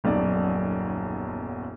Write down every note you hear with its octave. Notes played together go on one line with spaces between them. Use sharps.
D#1 B1 F#2 D5